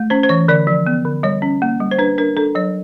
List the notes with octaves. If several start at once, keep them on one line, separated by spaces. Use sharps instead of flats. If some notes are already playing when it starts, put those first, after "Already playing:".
Already playing: A3
C#4 C5
C5
E3 C#5
D3 D5
F3
B3
D3
G3 C#5
C#4
A#3
G3
C5
D4 B4
D4 A#4
D4 A4
F#3 C#5